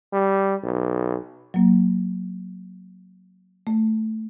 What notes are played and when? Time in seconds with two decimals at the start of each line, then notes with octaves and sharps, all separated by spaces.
0.13 G3
0.64 B1
1.54 F#3 A#3
3.67 A3